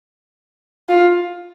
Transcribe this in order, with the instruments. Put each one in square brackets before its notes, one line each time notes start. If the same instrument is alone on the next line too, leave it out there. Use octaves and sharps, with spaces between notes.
[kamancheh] F4